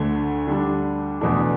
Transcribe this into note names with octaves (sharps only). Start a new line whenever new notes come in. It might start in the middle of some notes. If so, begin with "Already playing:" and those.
Already playing: D2 D3 A3
D3 G3 D4
E2 B2 A3 D4